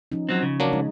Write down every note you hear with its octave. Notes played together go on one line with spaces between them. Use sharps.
F3 C#4 D#4
F#3 C4
C#3
F#3 A#3 D4
G#3 D#4